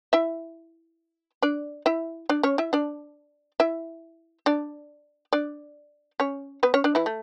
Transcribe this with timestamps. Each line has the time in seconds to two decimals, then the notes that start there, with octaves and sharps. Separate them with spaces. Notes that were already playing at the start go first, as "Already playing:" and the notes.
0.13 E4 E5
1.42 D4 D5
1.86 E4 E5
2.29 D4 D5
2.43 C#4 C#5
2.58 E4 E5
2.73 D4 D5
3.60 E4 E5
4.46 D4 D5
5.33 D4 D5
6.20 C#4 C#5
6.63 B3 B4
6.74 C#4 C#5
6.84 D4 D5
6.95 E3 E4
7.06 A3